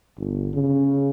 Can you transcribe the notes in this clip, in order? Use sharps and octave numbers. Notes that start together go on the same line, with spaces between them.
G1
C#3